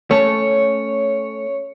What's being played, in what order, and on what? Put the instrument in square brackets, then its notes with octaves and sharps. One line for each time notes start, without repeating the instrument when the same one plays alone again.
[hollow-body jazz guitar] A3 C#4 A4 [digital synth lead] C#5